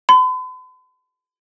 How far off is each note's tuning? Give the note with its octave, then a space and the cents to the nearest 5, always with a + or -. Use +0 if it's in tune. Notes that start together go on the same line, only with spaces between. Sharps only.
B5 +45